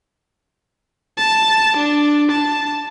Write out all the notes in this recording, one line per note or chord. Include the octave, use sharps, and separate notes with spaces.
A5
D4
A5